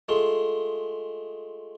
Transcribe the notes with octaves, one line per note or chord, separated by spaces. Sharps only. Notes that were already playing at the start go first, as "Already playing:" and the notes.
G#3 A3 F4